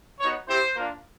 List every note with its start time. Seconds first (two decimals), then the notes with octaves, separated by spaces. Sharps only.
0.20 B3 D#4 F#4 C#5
0.49 C4 E4 G4 C5
0.76 A#3 D4 F4